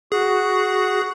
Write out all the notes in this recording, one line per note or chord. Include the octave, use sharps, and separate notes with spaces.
F#4 G#4